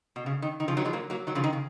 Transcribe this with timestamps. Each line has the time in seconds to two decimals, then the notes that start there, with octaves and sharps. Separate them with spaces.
0.16 B2
0.26 C#3
0.42 D#3
0.60 D#3
0.68 C#3 F3
0.77 D#3 F#3
0.85 F3 G#3
0.93 F#3 A#3
1.10 F#3 A#3
1.27 D#3 F#3
1.35 C#3 F3
1.44 D#3
1.53 C#3